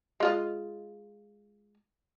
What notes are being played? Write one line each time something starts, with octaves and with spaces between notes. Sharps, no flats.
G#3 F4 D#5